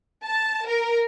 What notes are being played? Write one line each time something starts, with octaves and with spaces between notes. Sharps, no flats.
A5
A#4